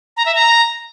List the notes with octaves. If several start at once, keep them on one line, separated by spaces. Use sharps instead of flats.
A#5
E5
A#5